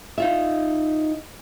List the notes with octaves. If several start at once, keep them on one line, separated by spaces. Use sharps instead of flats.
D#4 F4 E5